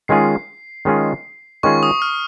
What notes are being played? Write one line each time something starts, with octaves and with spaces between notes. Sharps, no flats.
D#3 G#3 C#4 F4 G#4 C7
D#3 G#3 C#4 F4 G#4
D#3 G#3 C#4 F4 G#4 C#6
D#6
F6